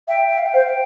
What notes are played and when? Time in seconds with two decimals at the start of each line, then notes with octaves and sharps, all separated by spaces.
0.07 E5 G5
0.30 E5
0.38 F5
0.46 G5
0.53 C5 F5
0.69 G5